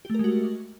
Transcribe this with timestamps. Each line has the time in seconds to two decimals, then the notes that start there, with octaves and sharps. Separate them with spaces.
0.05 G4
0.10 A3
0.14 A#4
0.19 G#3
0.24 F#4